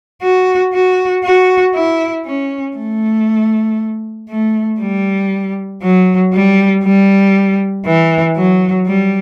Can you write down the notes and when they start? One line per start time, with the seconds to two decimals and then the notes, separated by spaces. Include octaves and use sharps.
0.22 F#4
0.73 F#4
1.24 F#4
1.74 E4
2.25 C#4
2.77 A3
4.29 A3
4.80 G3
5.82 F#3
6.33 G3
6.84 G3
7.85 E3
8.36 F#3
8.87 G3